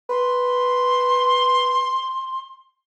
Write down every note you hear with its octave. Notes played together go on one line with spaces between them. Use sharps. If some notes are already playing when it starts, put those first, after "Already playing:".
B4 C6